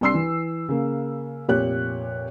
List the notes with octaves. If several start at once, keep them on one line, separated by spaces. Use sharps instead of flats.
C2 D4 C6 E6 C7
E3
C#3 A#3
F1 A#2 G4 C#5 F#6